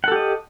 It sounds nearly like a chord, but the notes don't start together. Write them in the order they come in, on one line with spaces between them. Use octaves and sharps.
F#5 A4 G4 D#5